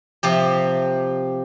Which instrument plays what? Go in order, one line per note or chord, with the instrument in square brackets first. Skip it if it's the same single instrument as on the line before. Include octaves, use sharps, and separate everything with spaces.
[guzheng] C3 F3 G4